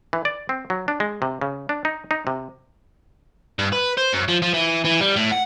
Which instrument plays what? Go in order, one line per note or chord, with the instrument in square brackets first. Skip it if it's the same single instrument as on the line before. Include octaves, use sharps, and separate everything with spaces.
[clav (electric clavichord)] E3
D5
C4
F#3
D4
G#3
C3
C#3
D4
D#4
D#4
C3
[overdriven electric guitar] G2
B4
C5
F#2
F3
F3
E3
E3
G3
A2
F#5